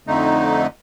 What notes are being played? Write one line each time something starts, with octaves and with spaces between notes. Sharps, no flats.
F2 D3 A3 D#4